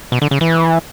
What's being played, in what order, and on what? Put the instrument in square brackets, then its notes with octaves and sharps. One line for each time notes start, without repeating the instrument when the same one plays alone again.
[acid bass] B2
D3
C#3
E3